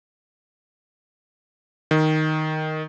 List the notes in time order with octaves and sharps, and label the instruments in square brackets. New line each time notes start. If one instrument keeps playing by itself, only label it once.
[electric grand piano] D#3